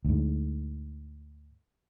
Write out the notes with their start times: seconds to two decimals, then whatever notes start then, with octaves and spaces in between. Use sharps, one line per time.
0.05 D2 G#2